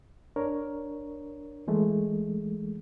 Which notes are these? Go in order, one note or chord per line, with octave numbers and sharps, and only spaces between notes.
D4 A#4 C#5
E3 G#3 A3